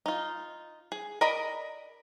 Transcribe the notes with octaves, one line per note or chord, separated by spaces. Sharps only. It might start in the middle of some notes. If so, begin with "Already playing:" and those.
D#4 F4
G#4
A#4 D5 D#5 A#5 B5